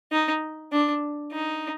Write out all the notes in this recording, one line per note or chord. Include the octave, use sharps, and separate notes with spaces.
D#4
D4
D#4